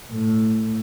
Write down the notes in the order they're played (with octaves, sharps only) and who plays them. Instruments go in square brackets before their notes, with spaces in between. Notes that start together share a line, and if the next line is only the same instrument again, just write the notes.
[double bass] A2